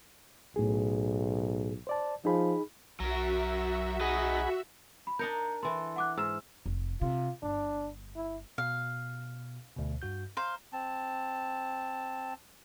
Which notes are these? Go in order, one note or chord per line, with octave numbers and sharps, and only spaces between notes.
B1 A2 G#4
C5 D5 A5
F3 D#4 G#4 B5
B1 F#3 F#4 A#4 E5
F#3 D#4 G#4 D#5 F#5 B5
B5
D4 D#4 A#4 G6 C#7
E3 A4 C6
F#5 D6 F#6
G#2 E6 F6 E7
F1
C3 F4
G1 D4
E4
B2 F5
D2 B2
G2 F#4 G6
C5 F5 A#5
C4 A5